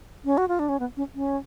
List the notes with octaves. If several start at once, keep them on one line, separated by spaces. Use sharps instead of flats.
C#4
F#4
F4
D4
C#4
B3
C#4
C#4